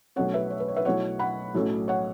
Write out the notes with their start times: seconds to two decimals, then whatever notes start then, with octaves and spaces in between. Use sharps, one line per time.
0.16 B1 B2 A3 C#4 C#5 F#5
0.34 B4 E5
0.50 C#5
0.60 B4
0.68 C#5
0.77 B4 E5
0.85 B1 B2 A3 E4 C#5 F#5
1.19 F#5 B5
1.55 B1 A2 F#3 A3 C#4
1.88 C#5 F#5